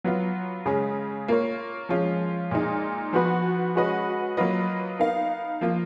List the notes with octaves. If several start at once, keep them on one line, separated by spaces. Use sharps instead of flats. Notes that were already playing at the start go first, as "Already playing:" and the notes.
F#3 B3 F4
C#3 G#3 C#4
A#3 F4 A#4 C#5
F3 G#3 C#4 F4
A#2 G#3 D#4
F3 B3 F#4 B4
G#3 C#4 F#4 B4 D#5
F#3 A#3 F4 B4 D#5
B3 D#4 A#4 F5
F3 A#3 F4